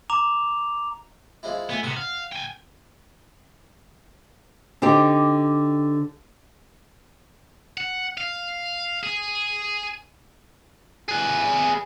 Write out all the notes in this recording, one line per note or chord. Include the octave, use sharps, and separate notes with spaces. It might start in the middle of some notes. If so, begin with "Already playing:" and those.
A#5 D6 F7
F3 G#3 E4
A3 B3 G#5
C3 B3 F#5
F5
G5 G#5
D3 C4 D#4 G4
F#5
F5
G#4
G#4 B4